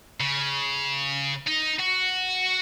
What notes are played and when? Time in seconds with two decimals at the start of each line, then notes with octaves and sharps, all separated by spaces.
0.20 C#3
1.47 D#4
1.79 F#4